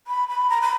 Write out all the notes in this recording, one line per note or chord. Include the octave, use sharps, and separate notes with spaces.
B5
B5
A#5
B5